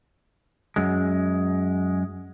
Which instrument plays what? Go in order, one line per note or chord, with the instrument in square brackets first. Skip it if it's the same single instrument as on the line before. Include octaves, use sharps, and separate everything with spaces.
[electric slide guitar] F#2 G#3